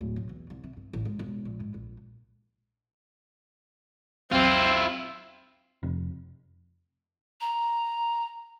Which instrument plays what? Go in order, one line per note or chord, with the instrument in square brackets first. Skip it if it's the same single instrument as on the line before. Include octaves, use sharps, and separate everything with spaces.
[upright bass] D1
B1
E2
C2
C3
G2
A1
G#2
E1
A#1
G#2
A#1
[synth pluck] A#1 E2 F#3 [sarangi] C4 [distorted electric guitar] E4 F4
[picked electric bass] F1
[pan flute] A#5